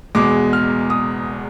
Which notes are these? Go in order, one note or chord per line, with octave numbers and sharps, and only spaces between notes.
E2 B2 G#3 D6
F6
D#6